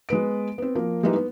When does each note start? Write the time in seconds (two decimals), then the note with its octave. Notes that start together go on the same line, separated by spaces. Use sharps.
0.09 G#3 B3 B4 D7
0.58 B3 C4
0.75 F3 A#3 A#4
1.03 G3 G#3 A#3 D#4 E4 B4
1.16 B3